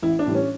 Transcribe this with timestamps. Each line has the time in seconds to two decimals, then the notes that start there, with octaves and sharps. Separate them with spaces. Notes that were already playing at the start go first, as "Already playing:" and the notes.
0.03 A1 E4
0.19 D4
0.26 A2 E3 G3
0.35 C#4